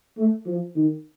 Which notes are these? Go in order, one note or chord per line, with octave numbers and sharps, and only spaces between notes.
A3
F3
D#3